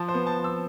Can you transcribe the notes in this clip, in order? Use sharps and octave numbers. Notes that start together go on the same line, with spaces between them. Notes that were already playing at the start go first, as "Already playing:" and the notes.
Already playing: F3 A5
C5
B3
A5
F3
E6